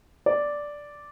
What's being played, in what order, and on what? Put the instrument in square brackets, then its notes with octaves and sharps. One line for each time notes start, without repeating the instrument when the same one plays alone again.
[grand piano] D5